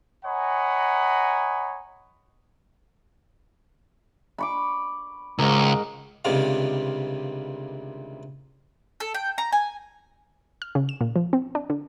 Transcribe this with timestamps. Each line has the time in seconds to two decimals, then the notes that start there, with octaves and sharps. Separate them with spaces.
0.25 C#5 D#5 F#5 G#5 A#5 B5
4.38 B5 C#6 D6
5.39 C#2 G#2 A#4
6.25 C#2 G2 C3 D#3 F5
9.00 A4
9.14 G5
9.38 A#5
9.52 G#5
10.62 F6
10.75 C#3
10.89 E7
11.01 A#2
11.16 F3
11.33 C4
11.55 D4
11.70 D3